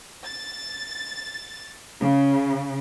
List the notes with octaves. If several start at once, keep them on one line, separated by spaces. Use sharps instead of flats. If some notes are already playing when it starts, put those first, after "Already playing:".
A6
C#3